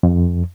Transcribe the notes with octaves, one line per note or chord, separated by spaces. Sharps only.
F2